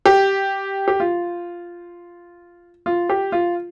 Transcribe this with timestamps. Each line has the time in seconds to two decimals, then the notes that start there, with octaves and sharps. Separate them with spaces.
0.06 G4
0.88 G4
1.00 F4
2.86 F4
3.10 G4
3.32 F4